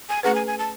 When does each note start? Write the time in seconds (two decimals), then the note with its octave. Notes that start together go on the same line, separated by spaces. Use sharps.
0.09 G#5
0.23 A3 C#4 G#4 B4 F#5
0.35 G#5
0.47 G#5
0.59 A5